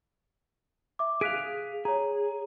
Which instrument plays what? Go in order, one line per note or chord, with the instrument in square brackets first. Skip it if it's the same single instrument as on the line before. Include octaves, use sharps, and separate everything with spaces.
[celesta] E5 D6
[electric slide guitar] G#4 F5 [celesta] F#6 B6 D7
[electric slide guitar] G#4 [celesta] C#5 A#5